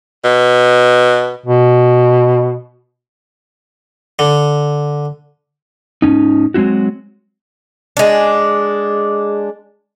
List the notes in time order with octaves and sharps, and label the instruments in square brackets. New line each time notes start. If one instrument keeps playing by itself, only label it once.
[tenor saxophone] B2
[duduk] B2
[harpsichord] D3
[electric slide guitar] G#2 C#3 C#4 D#4
F#3 G#3 C4 E4 F#4
[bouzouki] G#3 D4